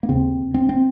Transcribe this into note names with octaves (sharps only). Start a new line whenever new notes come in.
A#3
D#2 C#3 C4
C4
C4